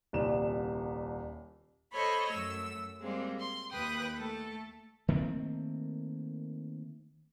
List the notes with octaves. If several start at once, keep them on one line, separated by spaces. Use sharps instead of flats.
D#1 C2 E7
A4 C5 C#5 D#5 B5
F#2 A3 E6
G3 G#3 A#3 C4
C6
D#2 B4 G5 D#6 F#6
A3 A4
D#3 A3 A#3 C4